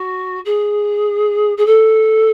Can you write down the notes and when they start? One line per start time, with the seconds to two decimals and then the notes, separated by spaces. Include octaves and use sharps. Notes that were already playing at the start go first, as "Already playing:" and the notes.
Already playing: F#4
0.45 G#4
1.57 G#4
1.66 A4